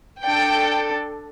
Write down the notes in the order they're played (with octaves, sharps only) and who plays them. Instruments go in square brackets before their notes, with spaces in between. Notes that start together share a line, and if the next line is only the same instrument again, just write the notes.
[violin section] D4 A4 G5